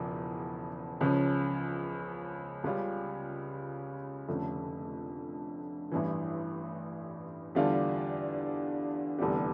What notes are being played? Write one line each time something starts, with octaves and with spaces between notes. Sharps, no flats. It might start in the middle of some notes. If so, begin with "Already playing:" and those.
Already playing: E1 E2 C#3 F3
C#2 C#3 F3 C#4
C#2 C#3 G3 C#4 F4
F1 F2 D3 A3 C#4
A1 G2 E3
E2 D3 G3 D4 F4
F1 E2 D3 G3